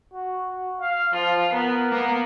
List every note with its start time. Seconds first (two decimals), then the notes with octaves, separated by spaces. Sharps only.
0.13 F#4
0.47 F#4
0.81 F5
1.13 F3 F4
1.53 B3 A#4
1.91 A#3 B3